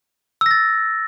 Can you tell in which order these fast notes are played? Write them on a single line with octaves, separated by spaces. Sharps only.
E6 A#6 A6